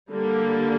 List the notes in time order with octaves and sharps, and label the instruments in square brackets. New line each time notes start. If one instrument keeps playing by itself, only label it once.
[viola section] D3 G3 A#3